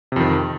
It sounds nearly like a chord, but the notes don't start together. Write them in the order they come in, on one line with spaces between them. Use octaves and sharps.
C3 F2 D#3